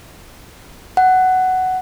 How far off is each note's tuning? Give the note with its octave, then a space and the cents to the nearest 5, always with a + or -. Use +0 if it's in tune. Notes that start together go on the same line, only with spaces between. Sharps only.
F#5 +10